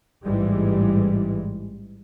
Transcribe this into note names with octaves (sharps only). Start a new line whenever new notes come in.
A1 G#2 E3 G3 G#3